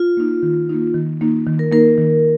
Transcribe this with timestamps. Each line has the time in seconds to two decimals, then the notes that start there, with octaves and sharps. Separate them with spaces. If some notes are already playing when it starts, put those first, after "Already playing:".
Already playing: F4
0.17 A#3 D#4
0.43 D#3
0.69 A#3 D#4
0.94 D#3
1.21 A#3 D#4
1.47 D#3
1.59 A#4
1.71 A#3 D#4 A#4
1.98 D#3